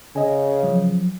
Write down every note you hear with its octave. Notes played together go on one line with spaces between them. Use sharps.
C#3 D#5 G#5
F3 F#3